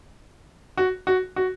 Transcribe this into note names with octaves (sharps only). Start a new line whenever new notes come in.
F#4
F#4
F#4